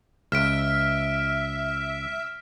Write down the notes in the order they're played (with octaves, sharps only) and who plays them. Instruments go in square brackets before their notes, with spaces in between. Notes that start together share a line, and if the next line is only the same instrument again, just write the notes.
[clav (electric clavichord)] C#2 [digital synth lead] E5 [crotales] F6 B6 D7